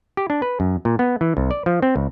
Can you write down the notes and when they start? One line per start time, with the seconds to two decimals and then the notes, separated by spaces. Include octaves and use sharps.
0.17 G4
0.30 D4
0.42 B4
0.60 F#2
0.85 A#2
0.99 B3
1.21 E3
1.37 C2
1.51 D5
1.66 F3
1.82 C4
1.96 C#2